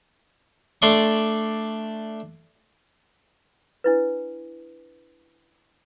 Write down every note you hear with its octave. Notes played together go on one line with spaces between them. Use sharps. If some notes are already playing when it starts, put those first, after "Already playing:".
A3 D4 D5 C6 C#6
D4 E4 B4